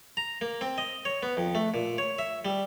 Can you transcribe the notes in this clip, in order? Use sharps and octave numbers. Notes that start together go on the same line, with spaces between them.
A#5
A#3
C4
D#5
C#5
B3
F2
A3
A#2
C#5
E5
G3